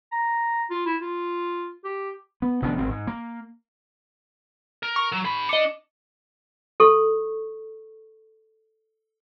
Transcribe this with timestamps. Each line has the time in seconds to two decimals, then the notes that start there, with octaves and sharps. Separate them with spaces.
0.12 A#5
0.70 F4
0.86 E4
1.01 F4
1.84 G4
2.42 B3
2.62 F1 D#3 B3 D4
2.78 G#1 C4
2.89 G#2
3.07 A#3
4.83 A#4
4.96 C#6
5.12 F#3
5.25 G#4 B5
5.49 D4 D#5 C#7
6.80 A4 C#6